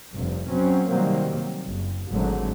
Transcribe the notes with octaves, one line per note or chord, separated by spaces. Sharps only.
F1 G2 C3
F#3 C4 C#4
C3 D#3 F#3 G3 A#3 C4
F#1
G#1 G#2 D3 F#3 A3